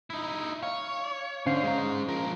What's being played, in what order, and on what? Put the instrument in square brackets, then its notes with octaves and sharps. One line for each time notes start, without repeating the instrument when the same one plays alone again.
[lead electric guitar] D#4 E4
[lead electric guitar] C#5 [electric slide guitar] F5
[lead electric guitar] D3 [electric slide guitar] C#4 C5 F5
[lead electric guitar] G#3 A#5
F3 A#4